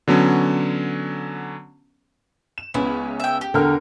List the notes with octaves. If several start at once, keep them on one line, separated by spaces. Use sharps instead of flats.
D3 F#3 B3 C#4
E7
C#2 B3 C#4 E4
E5 G5
G4
E2 D3 A#4 F6